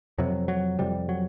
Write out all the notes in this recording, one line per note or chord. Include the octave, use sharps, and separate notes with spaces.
F2 C3 F#3
F#3
F2 C3 G3
F#3